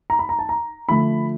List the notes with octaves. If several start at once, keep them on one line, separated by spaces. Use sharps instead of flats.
A#5
B5
A#5
A5
A#5
D3 F3 A3 B5